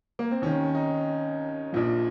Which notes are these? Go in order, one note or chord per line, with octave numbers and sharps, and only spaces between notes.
A#3
C4
D#2 D#3 C#4
D#4
A#1 A#2 F3